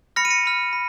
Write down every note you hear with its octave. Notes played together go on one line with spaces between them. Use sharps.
B5 F6 A#6 C#7
D#7
A#6 C#7
B5 F6
B5